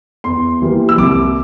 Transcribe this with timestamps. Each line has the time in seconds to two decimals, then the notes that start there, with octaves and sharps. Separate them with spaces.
0.24 E2 C6
0.62 E3 G3 A#3
0.89 E6
0.98 C2 D6